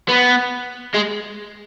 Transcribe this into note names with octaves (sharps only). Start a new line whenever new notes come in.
B3
G#3